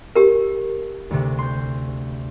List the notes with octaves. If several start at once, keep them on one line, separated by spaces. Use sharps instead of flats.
G4 A#4
D2 C3
C6 G6